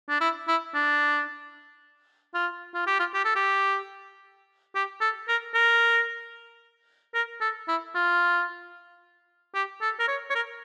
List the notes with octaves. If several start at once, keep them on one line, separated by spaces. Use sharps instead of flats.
D4
E4
E4
D4
F4
F4
G4
F4
G4
A4
G4
G4
A4
A#4
A#4
A#4
A4
E4
F4
G4
A4
A#4
C#5
C#5
A#4